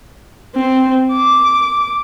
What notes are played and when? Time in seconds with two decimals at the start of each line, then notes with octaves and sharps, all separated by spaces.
0.56 C4
1.13 D6